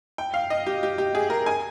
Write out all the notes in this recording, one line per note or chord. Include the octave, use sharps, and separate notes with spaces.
G5
F5
D#5
G4
G4
G4
G#4
A#4
G#5